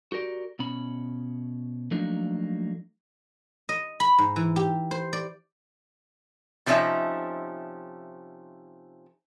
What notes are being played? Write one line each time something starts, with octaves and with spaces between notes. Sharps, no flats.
F#4 G4 A#4 D5
B2 C#4 B5
F3 F#3 A3 A#3 D4 D#4
D#5
B5
G#2
E3
G4
C5
D5
C3 F3 A3 C#4 D#4 E5